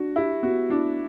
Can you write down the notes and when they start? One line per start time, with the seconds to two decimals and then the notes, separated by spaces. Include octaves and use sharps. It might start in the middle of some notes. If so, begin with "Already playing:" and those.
Already playing: D4 F#4
0.16 E4 G4
0.42 B3 F#4
0.70 D4 E4